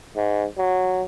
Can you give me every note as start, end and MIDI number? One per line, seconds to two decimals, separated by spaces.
0.16 0.45 44
0.58 1.04 54